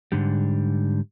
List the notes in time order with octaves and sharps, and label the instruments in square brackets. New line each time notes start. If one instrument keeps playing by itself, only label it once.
[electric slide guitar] G#2 D3 G3